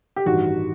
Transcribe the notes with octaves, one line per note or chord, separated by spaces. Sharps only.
G4
A1 G2 D#3 F#4